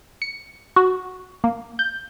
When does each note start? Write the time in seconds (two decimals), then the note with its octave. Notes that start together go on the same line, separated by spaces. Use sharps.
0.22 C#7
0.76 F#4
1.44 A#3
1.79 G6